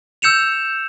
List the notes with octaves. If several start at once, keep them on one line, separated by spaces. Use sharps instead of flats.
E6 G6 C#7 E7 F7